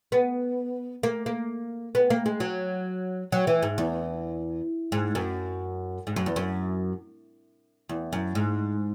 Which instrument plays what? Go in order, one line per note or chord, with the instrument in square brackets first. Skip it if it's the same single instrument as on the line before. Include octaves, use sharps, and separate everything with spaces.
[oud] B3
A#3
A#3
B3
A#3
G#3
F#3
F#3
E3
G#2
E2
G#2
F#2
G#2
F#2
E2
F#2
E2
F#2
G#2